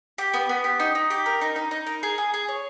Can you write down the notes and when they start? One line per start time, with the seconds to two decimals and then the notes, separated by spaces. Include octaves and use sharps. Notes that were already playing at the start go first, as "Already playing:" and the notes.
0.18 G4
0.33 B3
0.49 B3
0.64 G4
0.79 D#4
0.95 D#4
1.10 G4
1.26 A#4
1.41 D#4
1.56 D#4
1.71 D#4
1.86 A#4
2.03 G#4
2.18 G#4
2.34 G#4
2.48 C#5